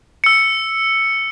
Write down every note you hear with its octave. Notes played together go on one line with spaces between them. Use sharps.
E6 C#7